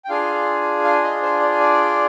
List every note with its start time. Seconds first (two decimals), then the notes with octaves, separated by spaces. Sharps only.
0.05 G5
0.09 D4 F4 G#4 F5
0.84 F5
1.03 D#5
1.22 C5
1.40 D5
1.60 D5